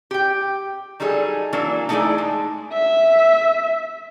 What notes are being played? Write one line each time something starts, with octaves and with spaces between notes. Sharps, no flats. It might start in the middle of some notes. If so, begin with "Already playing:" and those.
G4 G5
F#3 G3 D#4 G#4 A4
E3 F#3 A#3 D4
A3 D#4 E4 G#4 D5 E5
G#3
E5